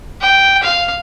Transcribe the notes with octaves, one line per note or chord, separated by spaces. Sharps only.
G5
F5